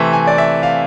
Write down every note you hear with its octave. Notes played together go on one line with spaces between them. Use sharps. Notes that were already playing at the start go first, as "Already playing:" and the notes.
Already playing: C3 E3 A3 C4 E5
G#5
D5
E5
F5